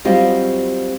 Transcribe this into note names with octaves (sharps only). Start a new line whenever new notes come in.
F#3 G3 C4 F4 G4 D#5